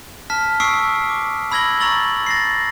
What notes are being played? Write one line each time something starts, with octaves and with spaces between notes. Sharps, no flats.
A5 F6 B6
C#6 D#6 E6 B6 C7 D7
D6
B5 E6 G#6 A#6 F#7 G7
A#5 C#6 E6 A6 F#7 G7
A6 A#6 C7